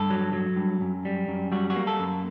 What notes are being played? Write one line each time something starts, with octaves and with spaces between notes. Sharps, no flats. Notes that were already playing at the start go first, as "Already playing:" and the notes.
Already playing: G2 A4
F#3
F#3
G2
F#2
G3
F#2
G3 F#4
F#4
A#3
A4
F#2